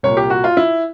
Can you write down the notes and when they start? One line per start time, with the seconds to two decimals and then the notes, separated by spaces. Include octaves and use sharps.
0.03 C2 A#2 C#5
0.17 G4
0.30 F#4
0.44 F4
0.57 E4